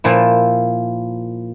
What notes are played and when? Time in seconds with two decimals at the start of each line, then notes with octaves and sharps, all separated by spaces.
0.04 A#2 F3 E4